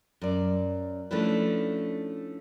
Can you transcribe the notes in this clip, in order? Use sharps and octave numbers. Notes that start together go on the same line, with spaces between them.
F#2 D5
F3 A3 C#4 D4 E4 B4